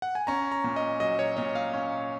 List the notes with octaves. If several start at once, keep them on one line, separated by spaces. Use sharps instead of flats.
F#5
G#5
C#4 A#5
A#5
A#2
D#5
F#3 D#5
C#5
A#2 D#5
F5
C#4